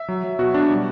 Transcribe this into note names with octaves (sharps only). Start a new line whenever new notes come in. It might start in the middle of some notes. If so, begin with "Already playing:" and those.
Already playing: E5
F#3
F#3
B2 F#4
B2 D4
G3